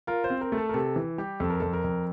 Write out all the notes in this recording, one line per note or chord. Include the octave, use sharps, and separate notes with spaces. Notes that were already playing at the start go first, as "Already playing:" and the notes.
F4 A#4
C5
C4
A#4
A3
A4
A#4
C3 A4
E3
G3 G4
F2 A4
A#4
F2 A4
A#4
F2